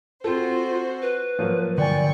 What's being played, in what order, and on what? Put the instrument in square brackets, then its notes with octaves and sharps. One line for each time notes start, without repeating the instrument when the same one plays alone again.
[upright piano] C4 A4 [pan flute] F4 [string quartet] F#4 C5
[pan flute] B4
[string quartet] G#2 [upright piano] F3 F#3 A#3
[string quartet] G2 G5 C#6 [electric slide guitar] D3 G#5 [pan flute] D5